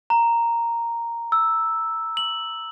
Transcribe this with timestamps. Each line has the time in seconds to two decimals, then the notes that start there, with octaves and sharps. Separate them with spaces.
0.10 A#5
1.32 E6
2.17 F#7